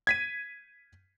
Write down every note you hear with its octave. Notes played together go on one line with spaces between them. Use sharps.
G#6 B6 D#7